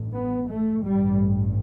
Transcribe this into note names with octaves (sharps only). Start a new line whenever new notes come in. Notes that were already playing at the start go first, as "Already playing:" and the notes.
Already playing: A1 G2
B3
A3
A1 G2 G3